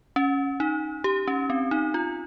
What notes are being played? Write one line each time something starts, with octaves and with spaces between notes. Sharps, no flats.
C#4
D#4
G4
C#4
C4
D#4
F4